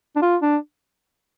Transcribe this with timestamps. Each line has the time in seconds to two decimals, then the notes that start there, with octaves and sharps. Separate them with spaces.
0.16 D4
0.22 F4
0.42 D4